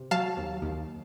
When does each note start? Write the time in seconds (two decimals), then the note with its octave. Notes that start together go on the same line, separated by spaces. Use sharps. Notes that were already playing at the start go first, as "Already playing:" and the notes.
Already playing: C3
0.11 F#3 F5 A5
0.37 D#2
0.62 D#2